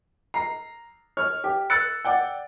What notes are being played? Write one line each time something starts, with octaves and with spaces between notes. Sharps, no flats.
A#5 C7
C#5 F6
G4
E6 F#6 A6 C#7
D5 F#5 G5